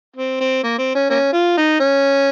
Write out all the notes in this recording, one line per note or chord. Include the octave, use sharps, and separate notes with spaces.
C4
C4
A#3
C4
C#4
A#3 C#4
F4
D#4
C#4